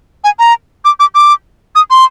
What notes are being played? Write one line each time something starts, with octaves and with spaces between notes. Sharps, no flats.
G#5
A#5
D6
D6
D6
D#6
C6